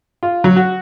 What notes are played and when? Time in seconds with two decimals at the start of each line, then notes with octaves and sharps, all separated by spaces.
0.23 F4
0.44 F#3
0.56 F#4